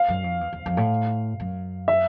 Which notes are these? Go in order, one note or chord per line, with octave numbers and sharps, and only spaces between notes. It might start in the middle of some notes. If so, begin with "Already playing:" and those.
Already playing: F5
F#2
F2
E2
E2
F2
A2
F#2
E5